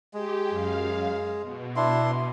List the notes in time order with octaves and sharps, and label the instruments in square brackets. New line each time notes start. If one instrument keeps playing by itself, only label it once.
[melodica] G#3 [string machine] G4
[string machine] F#2 F5
B2
[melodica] D4 E4 C6